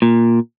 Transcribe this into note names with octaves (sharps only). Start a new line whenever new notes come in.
A#2